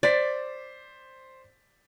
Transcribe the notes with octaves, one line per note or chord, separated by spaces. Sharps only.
C5 D5 A6 B6